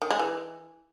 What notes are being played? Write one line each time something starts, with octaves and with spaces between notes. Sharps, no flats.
D#3
G#3
E3